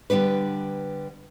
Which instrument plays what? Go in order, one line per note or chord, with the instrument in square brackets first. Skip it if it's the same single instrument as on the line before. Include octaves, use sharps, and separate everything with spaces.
[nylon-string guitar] D3 G3 B3 D4 B4